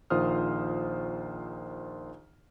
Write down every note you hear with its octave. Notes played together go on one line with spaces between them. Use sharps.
A#1 D#3 F4 C5 D#6 F6